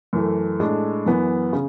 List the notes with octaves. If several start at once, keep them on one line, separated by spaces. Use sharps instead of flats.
F#2 E3 A3
A2 G#3 D4
F#2 E3 B3
C#3